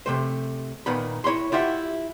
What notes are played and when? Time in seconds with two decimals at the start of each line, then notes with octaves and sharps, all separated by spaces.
0.06 C3 A3 C5
0.86 A#2 D#3 B3 B5
1.24 E4 C#5 B5 C6
1.52 E4 F4 G4 E5 F#5